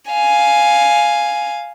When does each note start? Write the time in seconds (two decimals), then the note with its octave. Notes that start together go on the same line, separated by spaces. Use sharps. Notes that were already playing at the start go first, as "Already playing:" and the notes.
0.12 F5 G#5